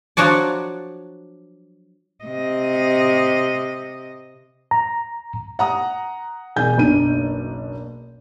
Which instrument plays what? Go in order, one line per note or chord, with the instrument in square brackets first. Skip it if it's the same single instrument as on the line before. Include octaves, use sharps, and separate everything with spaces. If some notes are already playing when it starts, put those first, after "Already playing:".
[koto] F3 F#3 D4 F#4 D5
[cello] C3 D#5
[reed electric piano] A#5
[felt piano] F#5 A#5 D#6
E1 G#4 G#5 G6
F#1 B1 D4 D#7